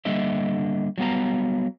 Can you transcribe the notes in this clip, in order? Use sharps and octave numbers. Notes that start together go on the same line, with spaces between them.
D3 G3 A#3 D4 D#5 E5
F#3 G3 B3 F5 A#5